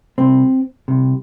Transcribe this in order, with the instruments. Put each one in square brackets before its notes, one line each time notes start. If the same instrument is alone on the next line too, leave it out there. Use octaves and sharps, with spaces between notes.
[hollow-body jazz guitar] C2 C3 C4
C2 C3